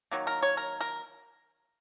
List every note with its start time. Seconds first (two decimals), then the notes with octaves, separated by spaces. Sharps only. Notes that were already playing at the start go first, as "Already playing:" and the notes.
0.11 D#3 F#3 A#3
0.27 A#4
0.42 C#5
0.57 A#4
0.81 A#4